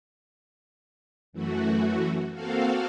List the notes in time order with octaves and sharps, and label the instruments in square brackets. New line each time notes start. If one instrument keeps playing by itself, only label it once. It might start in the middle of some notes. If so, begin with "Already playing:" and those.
[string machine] F#2 E3 A3 F#4
A#3 C4 F#4 A4 F5